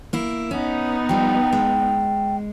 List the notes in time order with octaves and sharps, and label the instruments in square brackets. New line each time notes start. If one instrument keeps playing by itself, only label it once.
[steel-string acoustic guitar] A#3 E4
[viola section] B3 D#4 [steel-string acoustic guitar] C#4
[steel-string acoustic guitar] F3 G3 [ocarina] G5
[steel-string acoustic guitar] G#3